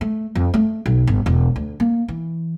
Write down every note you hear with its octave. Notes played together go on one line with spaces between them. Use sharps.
A3
F2
A3
B1
G1
E1
D2
A#3
E3